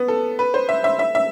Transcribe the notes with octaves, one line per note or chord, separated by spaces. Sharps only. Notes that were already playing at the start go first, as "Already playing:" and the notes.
Already playing: B3
A4
B4
C5
E5
E5
E5
E5